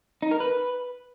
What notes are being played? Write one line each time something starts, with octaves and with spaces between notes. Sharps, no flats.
D#4
A#4
B4